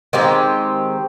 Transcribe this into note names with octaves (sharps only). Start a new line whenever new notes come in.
D#3 G#3 C4 G4